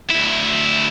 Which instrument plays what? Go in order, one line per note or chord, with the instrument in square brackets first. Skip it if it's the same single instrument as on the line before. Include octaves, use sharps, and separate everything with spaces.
[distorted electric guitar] D2 E4